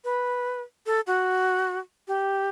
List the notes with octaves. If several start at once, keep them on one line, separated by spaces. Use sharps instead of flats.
B4
A4
F#4
G4